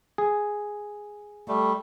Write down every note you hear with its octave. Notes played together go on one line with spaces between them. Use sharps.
G#4
G3 A3